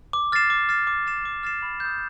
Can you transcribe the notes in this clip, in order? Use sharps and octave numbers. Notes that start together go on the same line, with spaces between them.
D6
F6 A6 C7 E7
D6
F6 A6 C7 E7
D6
F6 A6 C7 E7
D6
F6 A6 C7 E7
B5
D#6 G6